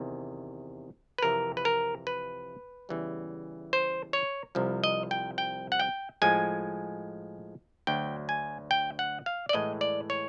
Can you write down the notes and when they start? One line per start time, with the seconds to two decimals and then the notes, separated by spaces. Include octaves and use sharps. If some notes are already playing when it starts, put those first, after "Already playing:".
Already playing: E2 C3 D#3
1.18 B4
1.23 F2 C3 E3 A#4
1.57 B4
1.65 A#4
2.07 B4
2.89 E2 C#3 E3 G3
3.73 C5
4.13 C#5
4.55 C2 C3 F3
4.84 D#5
5.11 G5
5.38 G5
5.72 F#5
5.79 G5
6.22 A2 F3 G#3 G#5
7.87 D2 D3 F#3 G5
8.29 G#5
8.71 G5
8.99 F#5
9.26 F5
9.49 D5
9.53 A2 E3 G#3 D#5
9.81 D5
10.10 C#5